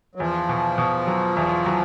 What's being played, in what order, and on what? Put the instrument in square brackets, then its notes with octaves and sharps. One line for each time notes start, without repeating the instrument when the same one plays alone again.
[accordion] F#3
[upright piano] E2 [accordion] F3
[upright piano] B2
B2
F#3
E2
F#3